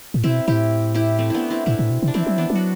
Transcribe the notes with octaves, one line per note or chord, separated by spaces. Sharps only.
A2
B2 C4 E4
A2 E4 G4
E4 G4
A3 C4
B3 D4 E4
C4 E4
A2 C4 E4
A2
B2
C3
D4
E3 C4 E4
F#3
E3 B3 D4
F#3
F#4